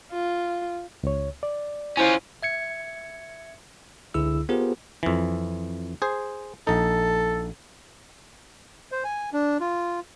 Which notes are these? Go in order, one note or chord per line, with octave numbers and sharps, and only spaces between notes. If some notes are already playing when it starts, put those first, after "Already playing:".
F4
C#2 C#5
D5
C#4 E4 F4 C5 G#5 G6
E5 G#6 C#7
C#2 D3 E4 G#4 E6
B3 F4 G4 G#4 A#4 C5
F2 E3
G#4 C5
A#1 D#4 A4
C5
G#5
D4
F4